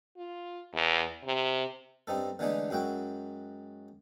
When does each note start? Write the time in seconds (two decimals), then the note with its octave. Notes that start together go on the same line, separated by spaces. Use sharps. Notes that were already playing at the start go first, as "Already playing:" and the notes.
0.17 F4
0.73 E2
1.25 C3
2.07 G2 C4 D#4 A4
2.39 D3 E3 G#3 A3 D4 D#4
2.70 F#2 G#3 E4 F#4 G5